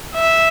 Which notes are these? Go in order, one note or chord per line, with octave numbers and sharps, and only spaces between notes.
E5